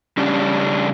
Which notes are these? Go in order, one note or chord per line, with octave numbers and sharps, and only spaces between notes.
C#3 G3 C#4 D4